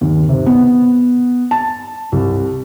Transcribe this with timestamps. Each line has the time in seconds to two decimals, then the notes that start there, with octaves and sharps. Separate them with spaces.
0.01 D#2
0.29 C3
0.46 B3
1.51 A5
2.12 C2